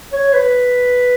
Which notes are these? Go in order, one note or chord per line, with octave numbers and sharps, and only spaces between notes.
C#5
B4